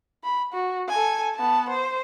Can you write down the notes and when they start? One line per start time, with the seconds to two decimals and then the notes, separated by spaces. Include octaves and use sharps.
0.24 B5
0.53 F#4
0.89 A4 G#5
1.35 B3 A5
1.69 C5